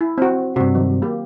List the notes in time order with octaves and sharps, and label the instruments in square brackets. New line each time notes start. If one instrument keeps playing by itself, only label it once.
[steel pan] E4
C4 F#4
[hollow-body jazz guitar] G2 C3 [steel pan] F#4
[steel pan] D#3 F#3
A#3 G4